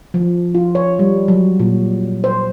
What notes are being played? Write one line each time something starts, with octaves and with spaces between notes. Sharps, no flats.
F3
F4
C#5
G3
F#3
A#2
C5